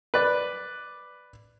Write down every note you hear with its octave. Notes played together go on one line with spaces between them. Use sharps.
B4 D5